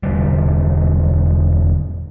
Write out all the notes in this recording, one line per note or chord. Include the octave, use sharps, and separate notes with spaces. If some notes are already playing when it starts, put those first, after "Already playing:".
E1 D3 G3